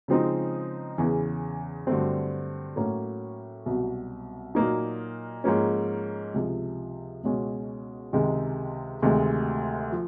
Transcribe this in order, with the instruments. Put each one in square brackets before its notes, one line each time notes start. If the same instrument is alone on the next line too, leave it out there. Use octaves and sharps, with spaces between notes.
[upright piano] C#3 F3 G#3 C4 D#4
E2 C#3 E3
G2 D3 F#3 A3 C4
A2 F#3 A#3 C#4 F#4
C2 B2 F#3
A#2 F#3 A#3 D#4
G#2 F3 A#3 C#4
C#2 C3 F3
C#2 B2 G#3 C#4
C#2 C3 D#3 G#3
D2 C3 D#3 G#3
F3